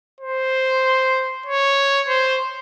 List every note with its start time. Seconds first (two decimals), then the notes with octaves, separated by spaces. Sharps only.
0.21 C5
1.46 C#5
2.09 C5